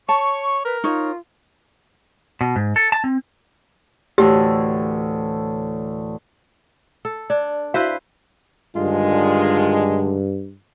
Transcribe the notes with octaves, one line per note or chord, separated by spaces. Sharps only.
C#5 A5 C#6
A#4 B4
D#4 F4 C#5
B2
G#2
A4
A5
C4
D2 A2 E3 G4
A4
D4 D5
E4 F#4 B4 C5 E5 F5
G2 D3 D#3 G#3 F4